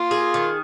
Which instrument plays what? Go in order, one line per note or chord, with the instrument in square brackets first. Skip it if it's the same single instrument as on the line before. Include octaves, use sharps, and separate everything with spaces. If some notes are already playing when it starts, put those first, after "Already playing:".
Already playing: [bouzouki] A#3 [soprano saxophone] F4
[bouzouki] G#4
D#3